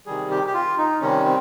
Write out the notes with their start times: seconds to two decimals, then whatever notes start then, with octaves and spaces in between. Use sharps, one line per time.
0.06 C3 D#3 G3 G#4
0.31 G4
0.47 G4
0.54 F4
0.78 D#4
1.01 C3 D#3 G3 C#4
1.25 C4